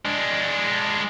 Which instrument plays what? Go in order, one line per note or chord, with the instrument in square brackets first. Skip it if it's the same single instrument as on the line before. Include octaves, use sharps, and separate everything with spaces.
[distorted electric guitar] G#3 D4